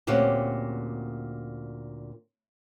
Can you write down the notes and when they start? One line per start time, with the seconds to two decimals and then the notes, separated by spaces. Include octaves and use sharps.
0.07 D2 A#2 C4 C#4 G4 F#5